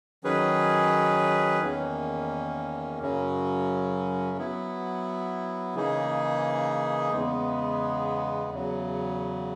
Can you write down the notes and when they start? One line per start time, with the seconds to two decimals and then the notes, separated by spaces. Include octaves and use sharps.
0.24 D#3 F#3 C#4 G#4 B4
1.61 E2 D#3 A#3 C#4
3.00 F#2 C#3 F#3 C#4
4.37 F#3 B3 E4
5.75 C#3 E3 A#3 D#4 G#4
7.12 E2 C#3 G#3 B3
8.51 E2 C#3 F#3